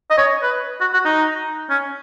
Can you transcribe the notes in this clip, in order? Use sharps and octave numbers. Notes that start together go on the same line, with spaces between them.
D#5
C#5
B4
F#4
F#4
D#4
C#4